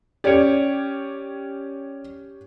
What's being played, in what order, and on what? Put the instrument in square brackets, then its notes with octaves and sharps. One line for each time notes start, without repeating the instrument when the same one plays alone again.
[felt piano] C#4 G4 [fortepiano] C#5 D5